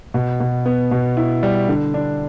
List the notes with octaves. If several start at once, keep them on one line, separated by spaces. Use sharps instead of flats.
B2
B2
B3
B2
E4
G3
D3
D4